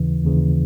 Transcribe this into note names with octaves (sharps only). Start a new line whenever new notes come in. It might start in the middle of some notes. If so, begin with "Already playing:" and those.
Already playing: D#2 C#3 E3
D#2 C#3 E3